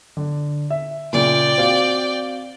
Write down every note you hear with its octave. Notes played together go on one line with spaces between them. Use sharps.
D3
E5
A#2 C#3 D5 G5
C4 F#4 F5